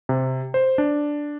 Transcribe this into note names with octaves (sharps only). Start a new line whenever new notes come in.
C3
C5
D4